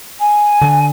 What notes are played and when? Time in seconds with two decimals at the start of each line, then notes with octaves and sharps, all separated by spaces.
0.20 G#5
0.61 D3